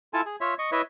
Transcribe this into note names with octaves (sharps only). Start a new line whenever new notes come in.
E4 F4 A4 G#5 A5
G#4
F4 C#5 E5
D#5 C#6
E4 B4 C#5 D#5 E5